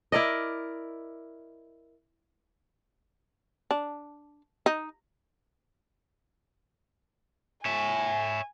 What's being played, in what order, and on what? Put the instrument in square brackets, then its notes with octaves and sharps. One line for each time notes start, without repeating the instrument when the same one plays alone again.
[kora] E4 A#4 D5 D#5
[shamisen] D4
D#4
[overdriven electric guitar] C#5 E5 [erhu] G#5